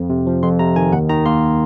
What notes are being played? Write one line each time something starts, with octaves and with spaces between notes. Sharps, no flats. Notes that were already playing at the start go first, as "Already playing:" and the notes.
Already playing: F2
C3
F3
F2 C6
C3 A#5
D#3 G#5
D#2 F#5
D#3 A#5
A#3 C6